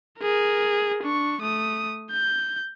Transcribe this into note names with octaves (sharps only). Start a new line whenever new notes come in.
G#4 A#4
D4 C#6
A3 D#6
G6